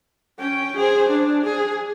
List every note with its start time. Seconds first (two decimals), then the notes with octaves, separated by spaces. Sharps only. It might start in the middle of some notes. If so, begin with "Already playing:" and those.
0.39 C#4 G5
0.77 G#4 C5
1.09 D4
1.44 G#4